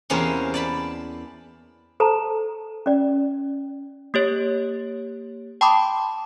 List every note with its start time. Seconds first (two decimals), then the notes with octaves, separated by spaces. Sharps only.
0.10 E2 C3 A#3 C4 C#4
0.54 D5 A5 B5
2.00 A4 C5 A5 A#5
2.86 C#4 D5
4.14 A#3 G4 C#5
5.61 G5 A5 B5 C6 D6 D#6